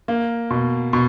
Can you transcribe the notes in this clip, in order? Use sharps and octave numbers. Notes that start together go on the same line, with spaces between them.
A#3
B2
B2